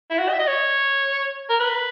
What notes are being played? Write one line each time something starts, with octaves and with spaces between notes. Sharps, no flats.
E4
F#4
D#5
E5
D#5
C#5
A#4
B4